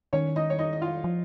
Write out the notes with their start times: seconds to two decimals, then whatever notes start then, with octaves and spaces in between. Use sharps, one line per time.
0.13 D#3 C#4 C#5
0.36 D#4 D#5
0.50 C#5
0.59 D#4 D#5
0.73 D#5
0.82 F4 F5
1.04 F3